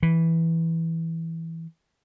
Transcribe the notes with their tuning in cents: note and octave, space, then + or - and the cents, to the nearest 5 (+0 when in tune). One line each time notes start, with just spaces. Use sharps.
E3 -5